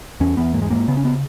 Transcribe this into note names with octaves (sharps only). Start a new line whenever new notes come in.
E2 C#4
E2 B3
G#2 A#3
G#3
G#2 A#3
C#3 B3
C#4
B3